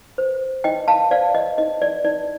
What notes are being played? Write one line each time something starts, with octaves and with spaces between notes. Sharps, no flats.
C5
D#4 D#5 G5
F5 A5
C5 D5 F5
D#5
D#4 D#5
D5
D#4 D5